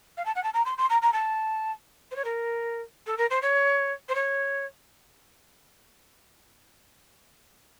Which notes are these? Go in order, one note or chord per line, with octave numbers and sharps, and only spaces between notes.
F5
A5
F#5
A5
A#5
C6
C6
A#5
A#5
A5
C5
C#5
A#4
A4
A#4
C5
C#5
C5
C#5